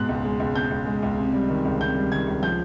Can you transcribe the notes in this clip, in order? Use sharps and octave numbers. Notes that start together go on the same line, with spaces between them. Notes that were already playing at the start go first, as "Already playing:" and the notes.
Already playing: G#2 B2 F#6
C#2
G#3
C#2
B2 G6
C#2
G#3
C#2
C3
G3
D#3
C#2
C3 G6
G3
D#3 G#6
C#2
F3 G6